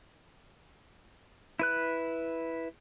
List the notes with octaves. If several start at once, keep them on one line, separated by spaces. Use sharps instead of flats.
E4 B4 F#6